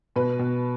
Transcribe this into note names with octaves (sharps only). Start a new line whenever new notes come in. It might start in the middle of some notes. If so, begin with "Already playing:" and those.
B2 B4
B2